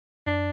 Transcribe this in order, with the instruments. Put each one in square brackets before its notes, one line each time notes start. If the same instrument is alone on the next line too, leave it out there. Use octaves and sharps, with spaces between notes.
[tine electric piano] F#2 [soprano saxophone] D4